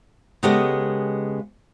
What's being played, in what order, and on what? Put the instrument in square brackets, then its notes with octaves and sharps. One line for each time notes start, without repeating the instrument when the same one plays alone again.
[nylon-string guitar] C#3 G#3 B3 G4 A4 D#5